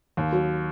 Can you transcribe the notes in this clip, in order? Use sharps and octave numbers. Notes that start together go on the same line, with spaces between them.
D#2
F#3